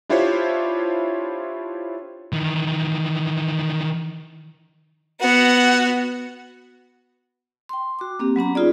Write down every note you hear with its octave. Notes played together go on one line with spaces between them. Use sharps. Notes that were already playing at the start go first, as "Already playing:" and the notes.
D4 E4 F4 G4 C5 C#5
D#3 E3
B3 F#4 F#5
G5 C6
F#4 D6
A#3 C4 G4
F#3 B3 C#4 A#5
D#4 F4 G#4 D5